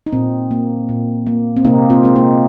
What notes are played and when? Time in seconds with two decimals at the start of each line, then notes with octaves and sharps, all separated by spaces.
0.06 D#4
0.12 A#2 C4
0.51 A#3
0.89 A#2
1.27 A#3
1.57 C4
1.65 C3 A#3 D#4
1.90 C4 F4
2.03 G#3 C4
2.16 A#3 D#4